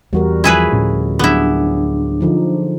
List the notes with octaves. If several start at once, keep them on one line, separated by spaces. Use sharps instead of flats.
E2 G3 F#4 A#4
F3 E4 G#4 B4
D2 A2 C#4
F#3 B3 D4 E4 G#4
D3 F3 D#4